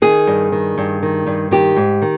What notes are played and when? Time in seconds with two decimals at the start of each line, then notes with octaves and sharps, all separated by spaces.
0.02 D#3 G#4
0.27 G2
0.52 D#3
0.78 G2
1.02 D#3
1.27 G2
1.51 D#3 G4
1.76 G#2
2.02 D#3